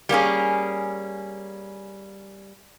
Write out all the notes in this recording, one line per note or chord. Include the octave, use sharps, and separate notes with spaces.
G3 A#3 C#4 G#4